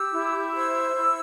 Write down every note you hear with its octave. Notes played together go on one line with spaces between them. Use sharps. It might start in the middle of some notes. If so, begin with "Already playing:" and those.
Already playing: G4 E6
E4
C5 E6
E4